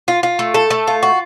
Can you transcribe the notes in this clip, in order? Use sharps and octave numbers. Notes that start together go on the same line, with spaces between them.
F4
F4
A3
A4
A3
F4
F#4